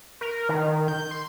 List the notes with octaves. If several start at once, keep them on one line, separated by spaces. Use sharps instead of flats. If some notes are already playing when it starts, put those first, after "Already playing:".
A#4
D#3
G6
C6